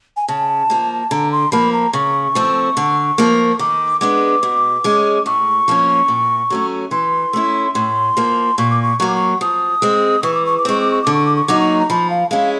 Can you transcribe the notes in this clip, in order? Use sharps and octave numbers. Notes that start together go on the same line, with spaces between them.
G#5
C#3 A5
F3 A#3
D3 A#5
C6
F3 A#3 B5
A#5
C#3 C#6
F3 A3 C4
D3
F3 A#3
D#3 D6
G#3 B3 D4 D6
B2
G#3 C#4
A2 C#6
F3 A#3 C#4
A#2
F#3 A3 C#4
E3 C6
A3 C#4 E4
A2 C6
F3 A#3
A#2 C#6
D6
C#6
F#3 A#3 C#6
D6
C#6
F3 D#6
G#3 C4
E3 C#6
D6
C#6
D6
G#3 C4 C#6
D6
C#6
D3 D6
C#6
D6
C#6
F#3 A#3 D#4 D6
C#6
A#5
F3 B5
F5
G#3 C#4 E4 F5